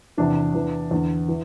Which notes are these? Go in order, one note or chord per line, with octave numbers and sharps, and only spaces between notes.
E2 C3 E3 D4
E2 E3
E2 D3
E3